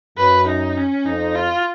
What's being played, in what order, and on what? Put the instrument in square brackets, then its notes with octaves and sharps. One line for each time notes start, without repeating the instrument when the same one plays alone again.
[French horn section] F#2 [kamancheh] B4
[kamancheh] D#4
C#4
[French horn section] F2 [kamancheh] D#4
[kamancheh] F4